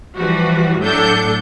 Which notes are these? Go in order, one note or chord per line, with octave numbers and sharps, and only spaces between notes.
E3 F3 G3 F#4
A2 F#3 D4 A4 G6 C#7